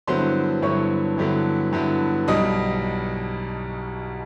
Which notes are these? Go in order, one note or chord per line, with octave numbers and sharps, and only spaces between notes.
G2 D3 F#3 B3 E4 C5 C6
G2 D3 F#3 B3 E4 C#5 C#6
G2 D3 F#3 B3 E4
G2 D3 F#3 B3 E4
B1 B2 G3 D#5 D#6